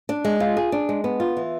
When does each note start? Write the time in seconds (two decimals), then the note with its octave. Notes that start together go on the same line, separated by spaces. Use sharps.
0.09 D4
0.25 G#3
0.40 F4
0.57 G#4
0.72 D4
0.89 G#3
1.04 B3
1.20 F4
1.37 E3